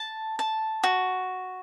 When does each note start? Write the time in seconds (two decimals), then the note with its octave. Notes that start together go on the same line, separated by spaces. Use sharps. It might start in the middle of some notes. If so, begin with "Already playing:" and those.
Already playing: A5
0.39 A5
0.84 F#4